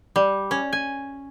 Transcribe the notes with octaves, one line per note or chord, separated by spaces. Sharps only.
G3
C#4
G#5